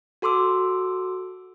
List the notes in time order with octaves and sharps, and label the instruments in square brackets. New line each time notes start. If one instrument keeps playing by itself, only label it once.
[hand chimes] F#4 A4 C6 D6 E6